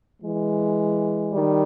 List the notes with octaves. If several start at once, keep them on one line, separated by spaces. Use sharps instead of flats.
E3 G#3
D#3 G3